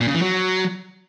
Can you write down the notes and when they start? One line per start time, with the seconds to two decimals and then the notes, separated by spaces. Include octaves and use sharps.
0.01 A#2
0.08 C#3
0.15 E3
0.22 F#3